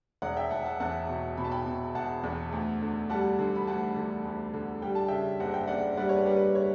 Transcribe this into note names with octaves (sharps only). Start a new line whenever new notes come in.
E1 D5 F#5
E5 G5
E1 F#5 A5
F#5 A5
E2 F#5 A5
B2
B2 B5
A5
G5 B5
B2
E1 F#5 A5
E2
D2
D3
G3 F#5 A5
D3
B5
D2 F#5 A5
D3
D2
D3
G3 G5
A5
C#3 E5 G5
F#1 F#5
G5
F#1 D5 F#5
G3 D5 F#5
C#5
B4 D5
G3
B4
C#5